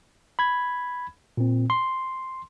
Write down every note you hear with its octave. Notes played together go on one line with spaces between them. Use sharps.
B5 G#6
A#2 C4
C6